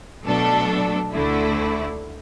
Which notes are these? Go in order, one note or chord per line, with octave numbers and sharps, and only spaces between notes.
B2 F#3 A3 D4 A4
D2 D3 A3 E4